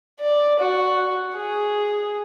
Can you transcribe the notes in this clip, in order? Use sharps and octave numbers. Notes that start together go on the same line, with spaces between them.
D5
F#4
G#4